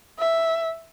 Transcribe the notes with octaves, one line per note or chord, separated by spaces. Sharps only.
E5